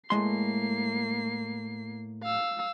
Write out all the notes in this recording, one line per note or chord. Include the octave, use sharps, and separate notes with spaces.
A2 G#3 A#3 C6 C7
F5 E6